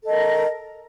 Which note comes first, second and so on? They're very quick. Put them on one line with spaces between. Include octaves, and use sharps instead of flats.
A4 D#5 A#4